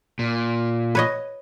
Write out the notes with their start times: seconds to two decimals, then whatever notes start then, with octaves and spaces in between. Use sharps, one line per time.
0.19 A#2
0.95 B4 C#5 D#5